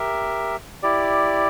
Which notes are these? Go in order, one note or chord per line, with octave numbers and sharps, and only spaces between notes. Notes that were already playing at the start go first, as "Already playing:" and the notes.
Already playing: G4 A#4 E5
E4 G4 D5